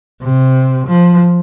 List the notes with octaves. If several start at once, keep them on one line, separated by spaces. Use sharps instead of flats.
C3
F3